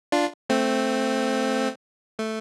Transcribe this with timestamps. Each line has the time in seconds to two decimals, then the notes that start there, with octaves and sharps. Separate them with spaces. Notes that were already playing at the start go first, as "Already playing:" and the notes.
0.12 D4 F4
0.50 A3 C4
2.19 A3